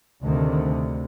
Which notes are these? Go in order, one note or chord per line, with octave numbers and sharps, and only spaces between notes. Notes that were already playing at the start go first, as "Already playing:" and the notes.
D2 C3 D#3